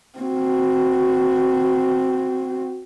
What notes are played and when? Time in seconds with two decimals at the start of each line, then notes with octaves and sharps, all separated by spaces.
0.18 C4 F#4